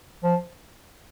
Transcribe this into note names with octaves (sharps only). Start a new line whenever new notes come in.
F3